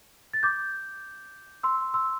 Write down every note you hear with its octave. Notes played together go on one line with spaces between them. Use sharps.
A6
D6 G6
C6 E6
C6 E6